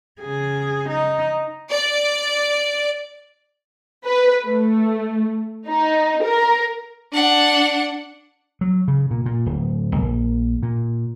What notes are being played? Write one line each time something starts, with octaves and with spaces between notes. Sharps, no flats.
C#3 G#4
D#4
D5
B4
A3
D#4
A#4
D4 F#5
F#3
C#3
A#2
A#2
D1
A#1
A#2